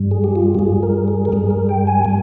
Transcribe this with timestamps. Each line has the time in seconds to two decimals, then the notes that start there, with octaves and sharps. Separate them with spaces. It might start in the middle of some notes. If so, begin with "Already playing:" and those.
Already playing: G2 G3
0.11 G#4
0.24 G4
0.36 F4
0.55 G4
0.59 G2 G3 G#4
0.83 A#4
1.08 G#4
1.25 A#4
1.32 G2 G3 G#4
1.50 A#4
1.69 G5
1.87 G#5
2.05 G3 G#5